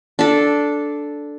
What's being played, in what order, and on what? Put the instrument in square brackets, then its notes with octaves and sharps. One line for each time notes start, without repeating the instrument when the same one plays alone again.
[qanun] D4 A4